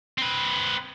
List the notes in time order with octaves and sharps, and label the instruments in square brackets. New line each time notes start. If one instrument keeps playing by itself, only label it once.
[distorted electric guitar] C4 B4